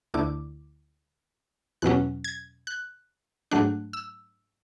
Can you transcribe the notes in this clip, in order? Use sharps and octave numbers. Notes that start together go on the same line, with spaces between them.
D2 D3 A3 E4 D6
E2 B2 F#3 C#4 F#6
G#6
F#6
G#2 F#3 A3 D4 F#6
E6